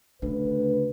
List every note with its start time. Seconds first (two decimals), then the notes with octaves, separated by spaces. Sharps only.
0.22 D2 C#3 B4